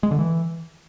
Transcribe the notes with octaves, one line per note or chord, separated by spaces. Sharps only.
G#3
D3
E3